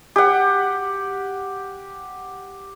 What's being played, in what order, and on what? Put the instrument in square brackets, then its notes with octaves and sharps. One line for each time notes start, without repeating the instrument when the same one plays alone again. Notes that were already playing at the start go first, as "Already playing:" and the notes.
[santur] G4 F#5